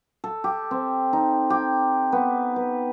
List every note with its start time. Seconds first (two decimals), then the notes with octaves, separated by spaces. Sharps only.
0.24 A4
0.44 G4
0.71 C4
1.13 D#4
1.50 G4
2.12 B3
2.56 B4